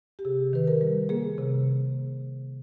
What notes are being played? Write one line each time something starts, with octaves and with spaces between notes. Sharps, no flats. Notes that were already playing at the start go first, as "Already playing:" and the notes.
G4
C3 G#4
D#3 B4
A#4
G3
A#3 G#4
C3